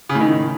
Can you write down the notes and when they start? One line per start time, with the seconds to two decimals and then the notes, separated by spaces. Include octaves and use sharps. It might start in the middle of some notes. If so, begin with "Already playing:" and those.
0.09 C#3
0.15 A2
0.21 D#3